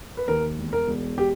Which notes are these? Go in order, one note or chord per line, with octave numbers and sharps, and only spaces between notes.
B4
D#2 A#4
E1
A#4
E1
G4